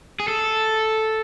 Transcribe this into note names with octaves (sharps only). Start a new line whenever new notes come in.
G#4
A4